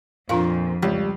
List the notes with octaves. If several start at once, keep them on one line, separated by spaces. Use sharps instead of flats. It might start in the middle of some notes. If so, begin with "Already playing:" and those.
F2 A#2 D4 F4 F5
C#2 G3